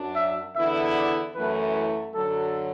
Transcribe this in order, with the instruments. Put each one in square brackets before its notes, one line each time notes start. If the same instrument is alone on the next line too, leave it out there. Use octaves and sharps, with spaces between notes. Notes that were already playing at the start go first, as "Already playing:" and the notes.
Already playing: [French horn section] F#2 F#3 D4
[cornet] E5
[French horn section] E2 D3 B3 E4 [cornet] E5
[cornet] D5
[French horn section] F#2 E3 A3 E4 [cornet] B4
[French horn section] F#2 D3 F#3 [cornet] A4